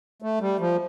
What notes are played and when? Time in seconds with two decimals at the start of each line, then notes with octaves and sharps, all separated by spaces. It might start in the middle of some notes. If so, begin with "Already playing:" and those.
0.22 A3
0.40 G3
0.60 F3